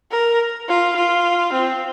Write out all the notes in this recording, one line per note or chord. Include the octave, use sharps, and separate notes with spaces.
A#4
F4
F4
C4